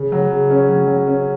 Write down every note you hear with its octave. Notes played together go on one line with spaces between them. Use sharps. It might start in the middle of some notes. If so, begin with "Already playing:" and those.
Already playing: C#3
F#3
C#3
C#4
F#3
F#3
C#4